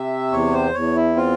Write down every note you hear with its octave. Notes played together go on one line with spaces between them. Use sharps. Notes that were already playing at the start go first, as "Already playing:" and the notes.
Already playing: C3 E5
E2 C#5
C5
E2 C#5
E4
C4 F4